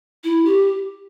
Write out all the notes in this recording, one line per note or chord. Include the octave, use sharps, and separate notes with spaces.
E4
G4